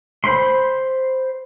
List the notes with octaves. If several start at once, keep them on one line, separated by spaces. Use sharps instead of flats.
C5 B5 C6